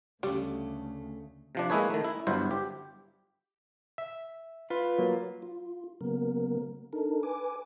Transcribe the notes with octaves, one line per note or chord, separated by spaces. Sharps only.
D2 C#3 G3 A3
C3 F3 D4
G#3 A#3 E4 G#4 B4 C#5
D#3 A3
E4
G1 G2 F#3 E4 C5
G4
E5
F4 B4
F#3 A#3
F4
C#3 F#3 A#3 B3 A#4
D4 D#4 A4 A#4
B4 G#5 D6